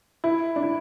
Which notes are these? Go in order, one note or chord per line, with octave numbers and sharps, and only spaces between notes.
E4
D4
E4